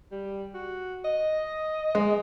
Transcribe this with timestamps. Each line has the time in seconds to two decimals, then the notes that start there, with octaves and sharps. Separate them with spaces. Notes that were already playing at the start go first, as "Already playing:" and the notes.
0.11 G3
0.54 F#4
1.05 D#5
1.95 G#3